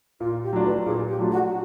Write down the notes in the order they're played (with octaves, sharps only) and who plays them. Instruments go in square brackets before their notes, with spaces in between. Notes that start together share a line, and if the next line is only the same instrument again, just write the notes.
[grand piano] A#2 [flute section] F4
[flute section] G4
[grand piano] F#3 A3 D4 F4
[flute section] B4
[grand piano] A#2 [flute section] G#4
[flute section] G4
[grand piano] F#3 A3 D4 F4
[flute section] F#4